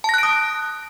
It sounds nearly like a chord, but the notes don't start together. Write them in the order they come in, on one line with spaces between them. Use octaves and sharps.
A5 A#6 F#6 D7 D#6